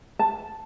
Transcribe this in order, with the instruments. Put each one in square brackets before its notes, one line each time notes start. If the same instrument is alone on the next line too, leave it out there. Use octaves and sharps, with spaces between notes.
[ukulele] A5